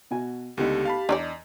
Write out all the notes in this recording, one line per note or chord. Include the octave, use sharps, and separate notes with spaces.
B2 F#4 G#5
C#2 D3 A3 B3 D#4 G4
F5 A5 B5
E2 D4 D#4 D5 D#5